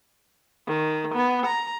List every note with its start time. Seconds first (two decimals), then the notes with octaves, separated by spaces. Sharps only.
0.68 D#3
1.15 B3
1.46 A#5